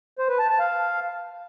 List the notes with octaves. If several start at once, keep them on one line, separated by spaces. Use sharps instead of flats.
C5
B4
A5
A5
F5